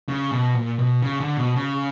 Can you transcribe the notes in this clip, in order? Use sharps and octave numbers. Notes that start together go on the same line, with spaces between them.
C#3
B2
A#2
B2
C#3
D3
B2
C#3